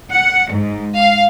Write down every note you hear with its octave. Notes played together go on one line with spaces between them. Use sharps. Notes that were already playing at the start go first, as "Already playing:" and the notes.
F#5
G#2
F5